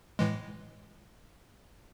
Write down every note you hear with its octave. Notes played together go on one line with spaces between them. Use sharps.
A2 E3 G#3